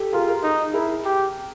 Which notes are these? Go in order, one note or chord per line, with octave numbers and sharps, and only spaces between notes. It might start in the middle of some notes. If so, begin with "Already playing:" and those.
Already playing: G4 A4
F4 G#4 A#4
G#4 A#4
D#4
E4 G#4 A#4
G4